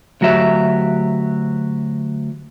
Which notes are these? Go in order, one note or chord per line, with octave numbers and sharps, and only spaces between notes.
D2 F#3 F#4 G4 E5